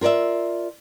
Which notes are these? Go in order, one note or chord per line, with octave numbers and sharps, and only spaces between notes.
F4 A#4 B4 D5 E5